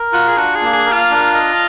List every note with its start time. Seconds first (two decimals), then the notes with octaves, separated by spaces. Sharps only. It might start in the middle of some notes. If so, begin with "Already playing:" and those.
Already playing: A#4
0.13 F4 F#4
0.28 G#4
0.37 D4 F#4
0.55 G#4
0.62 A#3
0.73 G#4
0.86 A#4
0.92 F4
1.10 D4
1.34 D#5